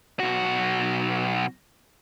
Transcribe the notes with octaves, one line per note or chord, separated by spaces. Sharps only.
B1 F#4